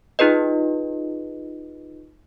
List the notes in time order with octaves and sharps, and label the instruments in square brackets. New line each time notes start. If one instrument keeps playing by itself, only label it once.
[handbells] D#4 F4 G#4 B4 D#5